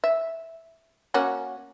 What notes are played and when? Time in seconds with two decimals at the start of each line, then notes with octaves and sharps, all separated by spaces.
0.04 E5
1.14 A#3 C#4 F#4